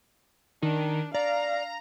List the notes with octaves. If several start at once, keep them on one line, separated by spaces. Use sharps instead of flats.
D#3 D4
D5 F5 A#5